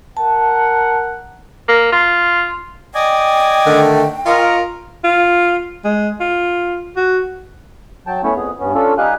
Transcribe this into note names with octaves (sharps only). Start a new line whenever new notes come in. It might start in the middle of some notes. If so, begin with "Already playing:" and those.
A#4 F#5 A5
A#3
F4
D5 D#5 G5 G#5
D3 D#3 A3
F4 A#4 D#5 C#6
F4
G#3
F4
F#4
F#3 G5 A5
A3 B3 C#4 E4 C#5
F2 B3 G#4
G2 B3 C#4
C#4 D4 F4 A4
G3 D#4 G4 F5 G#5 F#6